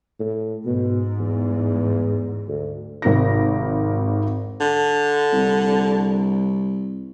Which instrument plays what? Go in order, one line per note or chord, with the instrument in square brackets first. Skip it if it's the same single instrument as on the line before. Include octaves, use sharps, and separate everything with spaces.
[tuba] A2
[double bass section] G#2 [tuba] B2
[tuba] E2
D2
[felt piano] G#1 C3 A#4 A#6
[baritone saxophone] D3
[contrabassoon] C2